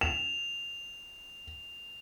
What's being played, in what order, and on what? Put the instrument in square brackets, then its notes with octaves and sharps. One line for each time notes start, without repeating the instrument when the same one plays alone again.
[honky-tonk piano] E7 [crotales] F7